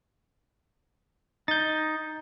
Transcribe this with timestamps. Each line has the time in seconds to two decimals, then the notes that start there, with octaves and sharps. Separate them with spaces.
1.48 D#4 G6 A6